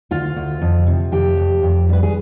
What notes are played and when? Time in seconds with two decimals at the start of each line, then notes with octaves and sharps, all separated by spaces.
0.11 D2 F4
0.36 D2
0.62 F2
0.87 C3
1.12 F2 G4
1.37 F2
1.63 F2
1.89 G3 B4
2.03 G#4